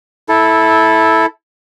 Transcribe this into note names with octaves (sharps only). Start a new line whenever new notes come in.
E4 A4